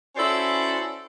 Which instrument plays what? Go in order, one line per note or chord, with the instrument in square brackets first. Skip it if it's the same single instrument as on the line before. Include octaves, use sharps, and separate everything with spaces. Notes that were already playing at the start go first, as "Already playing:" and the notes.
[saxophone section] C#4 E4 F#4 A4 C5 D5